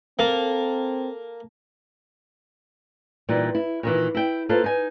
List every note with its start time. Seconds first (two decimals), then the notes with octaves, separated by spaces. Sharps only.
0.19 A#3 C4 A4
3.29 A#2 E3 G3 D#4
3.55 E4
3.83 A#2 D#3 E3
4.15 E4 G5
4.49 A#3 F4 A4 B4 C5
4.64 D#4 G#5